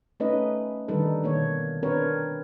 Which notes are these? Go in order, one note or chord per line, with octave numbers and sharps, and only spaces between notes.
A3 C#4 D#4 B4 D#5
D3 D#3 G3 D#4 A4 B4
B2 D#3 A#3 C#5
C4 D4 A#4 B4 C#5